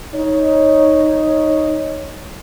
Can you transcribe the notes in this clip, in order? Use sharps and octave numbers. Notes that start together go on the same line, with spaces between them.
D#4 C#5